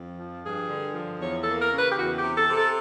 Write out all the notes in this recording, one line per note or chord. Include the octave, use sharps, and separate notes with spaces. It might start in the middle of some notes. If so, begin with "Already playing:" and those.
Already playing: F2
F3
G2 G#4
D3
F3
E2 C#5
A4
A#3
A#4
C#3
B4
G4
E2 F#4
G4
C3
A4
C3
A4